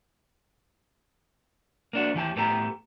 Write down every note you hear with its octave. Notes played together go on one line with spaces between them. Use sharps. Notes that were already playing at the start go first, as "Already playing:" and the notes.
A#3 D4 F#4
D#2 E3 G4 A5
A2 B3 G4 A4 A#5